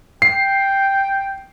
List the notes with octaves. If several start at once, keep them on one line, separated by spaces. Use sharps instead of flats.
G5 C7